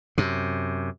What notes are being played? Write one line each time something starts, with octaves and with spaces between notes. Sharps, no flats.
F#2 C3